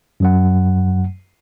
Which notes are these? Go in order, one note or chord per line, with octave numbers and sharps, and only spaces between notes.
F#2 F#3 F#5